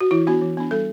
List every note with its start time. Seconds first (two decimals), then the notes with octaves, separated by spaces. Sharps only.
0.01 F#4
0.11 E3 E4
0.27 B3 D4 F#4
0.42 E3
0.57 B3 D4
0.71 G3 A4